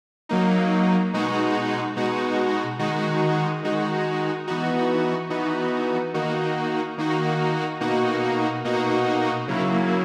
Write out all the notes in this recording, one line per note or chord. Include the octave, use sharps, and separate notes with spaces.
F#3 A#3 D#4
B2 G#3 D#4 F#4
B2 G#3 D#4 F#4
D#3 G#3 D#4 F#4
D#3 G#3 D#4 F#4
E3 B3 D#4 F#4
E3 B3 D#4 F#4
D#3 A#3 D#4 F#4
D#3 A#3 D#4 F#4
B2 A#3 D#4 F#4
B2 A#3 D#4 F#4
C#3 F#3 A#3 E4